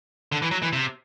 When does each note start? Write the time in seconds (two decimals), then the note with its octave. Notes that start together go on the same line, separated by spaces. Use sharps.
0.32 D3
0.42 E3
0.51 F#3
0.62 E3
0.73 C3